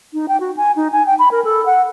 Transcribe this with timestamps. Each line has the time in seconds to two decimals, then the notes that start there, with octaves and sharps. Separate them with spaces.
0.14 D#4
0.28 G5
0.40 F#4
0.57 G#5
0.76 D#4
0.93 G#5
1.07 G5
1.19 B5
1.31 A#4
1.45 A4
1.66 F#5